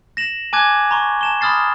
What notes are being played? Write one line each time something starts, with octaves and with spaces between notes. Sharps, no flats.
A#6 E7 F#7
G#5 A5 D6 F#6 G#6
A#5 C6 C#6
A5 E7 G7
B5 C6 D#6 F6 A6 C7